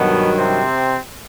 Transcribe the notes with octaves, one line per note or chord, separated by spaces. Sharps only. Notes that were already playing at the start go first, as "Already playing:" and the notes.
Already playing: G2 B2 D#3 F#3 B3
C3 C4